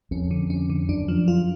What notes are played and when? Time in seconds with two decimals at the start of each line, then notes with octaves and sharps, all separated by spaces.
0.11 F2 C#4
0.31 D3
0.50 C#4
0.70 D3
0.89 F#2 D4
1.08 F3
1.28 F4